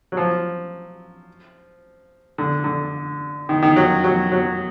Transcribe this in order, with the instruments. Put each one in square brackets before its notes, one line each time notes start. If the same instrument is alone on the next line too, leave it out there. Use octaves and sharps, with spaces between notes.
[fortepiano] F#3
F3
D3
D3
D#3
D#3
F#3
F#3
F#3